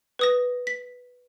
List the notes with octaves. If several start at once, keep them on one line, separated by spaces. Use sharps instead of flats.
B4 D#6 A#6
B6